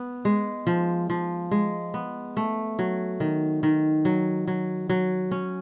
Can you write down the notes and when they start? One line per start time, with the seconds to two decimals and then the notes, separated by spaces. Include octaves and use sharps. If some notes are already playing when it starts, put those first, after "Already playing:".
Already playing: B3
0.25 G#3
0.67 F3
1.10 F3
1.51 G#3
1.94 B3
2.37 A3
2.79 F#3
3.20 D#3
3.63 D#3
4.05 F#3
4.47 F#3
4.89 F#3
5.31 C#4